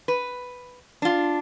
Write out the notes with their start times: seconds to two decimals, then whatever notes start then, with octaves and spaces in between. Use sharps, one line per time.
0.08 B4
1.02 D4 F4